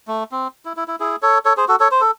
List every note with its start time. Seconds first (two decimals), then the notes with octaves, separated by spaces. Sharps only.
0.08 A3
0.32 C4
0.65 E4
0.77 E4
0.88 E4
1.00 E4 G#4
1.22 A4 C#5
1.45 A4 C#5
1.57 G#4 C5
1.68 F#4 A4
1.80 A4 C#5
1.91 C5
2.01 A4